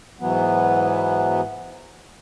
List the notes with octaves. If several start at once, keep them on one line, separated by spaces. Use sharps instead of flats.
G#2 E3 F#3 B3